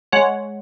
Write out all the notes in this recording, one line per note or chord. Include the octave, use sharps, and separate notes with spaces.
G#3 C#5 F#5